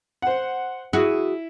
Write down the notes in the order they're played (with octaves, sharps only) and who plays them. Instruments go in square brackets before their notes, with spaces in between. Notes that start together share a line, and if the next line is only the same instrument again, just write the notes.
[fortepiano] C5 F#5
[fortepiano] E4 [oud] F#4 G#4